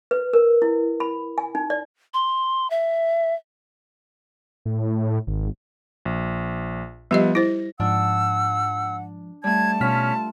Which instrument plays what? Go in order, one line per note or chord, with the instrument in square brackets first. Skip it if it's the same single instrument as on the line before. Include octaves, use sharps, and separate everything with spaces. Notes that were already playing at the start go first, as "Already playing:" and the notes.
[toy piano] B4
A#4
E4
B5
G#5
D#4
D5
[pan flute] C6
E5
[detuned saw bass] A2
G#1
[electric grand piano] A#1
[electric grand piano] F3 B3 [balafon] G3 G4 D#5
[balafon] E4 C5 [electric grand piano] A#6
[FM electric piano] G#2 F3 [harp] D4 [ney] F#5 [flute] E6
[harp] G3 A3 [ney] A5 [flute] G#6
[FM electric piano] B2 F6 B6 [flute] C#4 [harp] F4